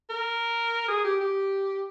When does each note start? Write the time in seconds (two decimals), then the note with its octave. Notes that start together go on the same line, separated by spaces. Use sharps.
0.10 A#4
0.89 G#4
1.05 G4
1.21 G4